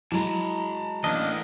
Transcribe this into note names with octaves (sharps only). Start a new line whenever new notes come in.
F#3 G#3 E4 A5 A#5
E3 A3 A#3 D4 D#5 A5